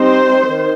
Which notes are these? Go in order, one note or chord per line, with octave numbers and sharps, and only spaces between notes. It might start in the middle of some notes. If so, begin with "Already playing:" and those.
Already playing: G3 C4 D#4 C5
D#3